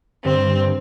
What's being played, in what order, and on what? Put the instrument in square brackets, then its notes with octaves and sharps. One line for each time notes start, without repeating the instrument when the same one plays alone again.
[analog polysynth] G2 [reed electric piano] D3 [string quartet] C4